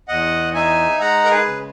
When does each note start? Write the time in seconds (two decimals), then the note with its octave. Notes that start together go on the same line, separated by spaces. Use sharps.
0.08 E2 D#5 F#5
0.54 D#4 E5 G#5
1.00 G#3 F#5 A#5
1.25 A#4
1.31 G#4 B4
1.46 C#3